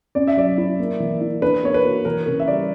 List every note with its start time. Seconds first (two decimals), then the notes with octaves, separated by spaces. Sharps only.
0.15 C#4 D5
0.28 E5
0.37 F#3 D5
0.58 E4
0.79 A#3
1.00 E3
1.21 E4
1.42 D4 B4
1.63 A#3 C#5
1.74 B4
1.84 F#4
2.05 E3 A#4
2.26 C#3 A#4
2.40 E5
2.47 G3 D5